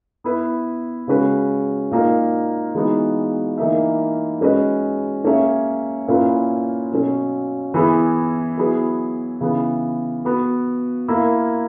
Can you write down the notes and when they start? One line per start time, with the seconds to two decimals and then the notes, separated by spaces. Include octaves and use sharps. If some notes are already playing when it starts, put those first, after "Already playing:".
0.24 B3 E4 B4
1.07 C#3 G#3 C#4 F#4 B4
1.91 A#2 A#3 D#4 A#4
2.75 E3 G#3 B3 D#4 F#4
3.58 E3 A#3 D#4 A#4 E5
4.41 G#3 C#4 F#4 B4 D#5
5.24 A#3 C#4 G#4 C#5 E5
6.08 A#2 A#3 C#4 E4 B4
6.91 B2 F#3 C#4
7.74 E3 B3 E4 G#4
8.58 F#3 B3 E4 G#4 B4
9.41 C#3 E3 B3
10.25 B3 F#4 B4
11.08 A#3 E4 A#4